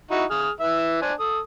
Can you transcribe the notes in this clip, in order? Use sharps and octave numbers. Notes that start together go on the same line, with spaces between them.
D#4 E4 F#4
G#4 D#6 F6
E3 E5
D4 C5 G#5
A4 D#6